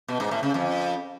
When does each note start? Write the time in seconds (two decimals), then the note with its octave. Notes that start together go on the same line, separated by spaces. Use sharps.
0.08 B2
0.20 G#2
0.31 A2
0.43 C#3
0.54 F2